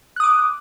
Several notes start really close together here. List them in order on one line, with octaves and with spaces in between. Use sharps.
F#6 D#6 D6